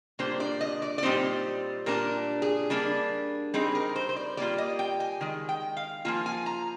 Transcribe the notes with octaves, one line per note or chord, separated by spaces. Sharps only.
A#2 G3 A#3 D4 C5
D5
D#5
D5
D5
A#2 G3 C4 D#4 C5
A#2 G3 D4 A#4
G#4
G3 A#3 D4
G3 C4 D#4 G#4
A#4
C5
C5
D5
G3 A#3 F4 D5
D#5
G5
G#5
D#3 G#3
G5
F5
F3 A#3 F4 G#5
G#5
A#5